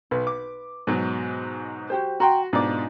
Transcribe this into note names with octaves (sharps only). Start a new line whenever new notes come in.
B1 B4
D6
G#2 B2 F#3
F#4 G4 C5
F#4 G5 A#5 C6
G#2 B2 D4 D#4 F4 D5